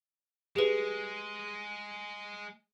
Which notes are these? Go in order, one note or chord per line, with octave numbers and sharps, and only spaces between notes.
G#3 G4 G#4 B4